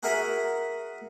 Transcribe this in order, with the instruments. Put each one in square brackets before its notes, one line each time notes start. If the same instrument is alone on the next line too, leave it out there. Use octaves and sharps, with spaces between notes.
[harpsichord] F#4 G#4 A#4 E5 F#5 G#5